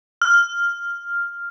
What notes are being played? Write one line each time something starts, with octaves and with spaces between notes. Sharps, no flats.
F6